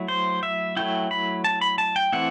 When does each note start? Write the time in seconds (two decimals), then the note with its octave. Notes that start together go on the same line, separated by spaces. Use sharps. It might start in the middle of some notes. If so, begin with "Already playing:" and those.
Already playing: F#3 A3 E4
0.08 C5
0.43 E5
0.77 F#3 A3 E4 G5
1.11 B5
1.44 A5
1.61 B5
1.78 A5
1.96 G5
2.13 E3 A3 C4 E4 F#5